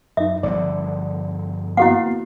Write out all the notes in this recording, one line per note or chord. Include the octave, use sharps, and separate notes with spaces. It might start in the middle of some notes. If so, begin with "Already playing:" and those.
F#2 D#4 E5
G1 D3 F3 D5
A#3 B3 E4 F#4 F5 F#5